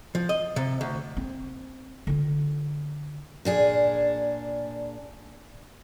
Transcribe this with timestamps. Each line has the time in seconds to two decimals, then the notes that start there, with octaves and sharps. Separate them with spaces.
0.15 F3
0.29 D#5
0.56 C3
0.81 D2
1.17 C4
2.07 D3 F4
3.45 A#2 D4 G#4